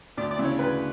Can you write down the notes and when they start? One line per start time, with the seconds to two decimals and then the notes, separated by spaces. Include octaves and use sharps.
0.17 D2 D5
0.31 D5
0.38 C#3 E3 G#3
0.45 C#5
0.59 D2 B4